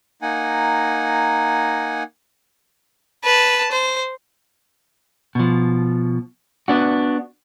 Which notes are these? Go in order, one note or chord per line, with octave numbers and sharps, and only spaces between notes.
A#3 D#4 F#5 G#5
B4 A5
C5
B2 F3
B3 D4 F#4